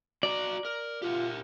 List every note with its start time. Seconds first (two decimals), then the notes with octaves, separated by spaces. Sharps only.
0.23 F#4 D5 D#5 A#5
0.65 A#4
1.02 F4 G4 A#4 F#5